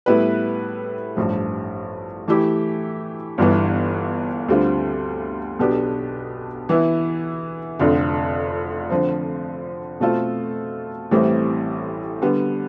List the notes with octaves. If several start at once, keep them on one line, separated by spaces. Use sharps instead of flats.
A2 G3 B3 E4 B4
A1 G2 F3
E3 A3 E4 G4
G1 G2 E3 B3
D2 D3 G3 C4 F4
B1 B2 B3 D4 G4
E3 B3 E4
F1 F2 D3
D3 F3 C4
B2 A3 C4 F4 A4
A1 A2 E3 G3 C4
D3 G3 B3